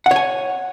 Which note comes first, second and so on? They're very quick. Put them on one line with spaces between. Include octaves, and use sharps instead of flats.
F#5 C#5 G#5